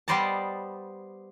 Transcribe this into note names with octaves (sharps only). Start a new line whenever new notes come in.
G3 B3 C5 D5 D#5 A5